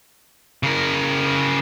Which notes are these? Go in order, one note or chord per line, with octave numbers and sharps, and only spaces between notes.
C#3 A#4